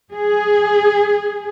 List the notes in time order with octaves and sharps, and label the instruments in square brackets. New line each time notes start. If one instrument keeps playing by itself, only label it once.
[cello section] G#4